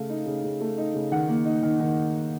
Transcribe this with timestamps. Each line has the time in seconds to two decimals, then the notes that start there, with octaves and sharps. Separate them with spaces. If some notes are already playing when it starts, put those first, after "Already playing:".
Already playing: C#3 A3 F5
0.10 D#4
0.26 C#3
0.44 C#3
0.61 A3
0.78 D#4
0.94 C#3
1.12 D#3 F#5
1.28 A#3
1.45 D#4
1.63 D#3
1.80 D#3